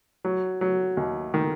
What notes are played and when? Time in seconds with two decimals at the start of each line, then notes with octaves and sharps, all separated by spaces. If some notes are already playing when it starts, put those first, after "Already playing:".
0.25 F#3
0.61 F#3
0.97 D#2
1.34 D#3